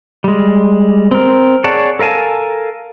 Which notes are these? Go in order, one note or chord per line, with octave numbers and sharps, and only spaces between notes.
G3 G#3
C4 A#4
G#4 C#5 D5 F#5 A5
A4 A#4 F5 G#5 A5